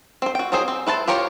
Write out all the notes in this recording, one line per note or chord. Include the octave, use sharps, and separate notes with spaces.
C4 C5
F#4 G5
F#3 C4 D#4 G#4 C5
C4
E4 B4 C5 A5
F4 G4 A#4 C5 C#5